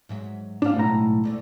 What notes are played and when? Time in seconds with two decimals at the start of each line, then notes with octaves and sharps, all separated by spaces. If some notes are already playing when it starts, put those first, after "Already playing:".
0.09 G#2 F#3 E5
0.62 G#2 A3 D4 F5
0.76 B1 A2 A#5
1.24 D2 D3 A3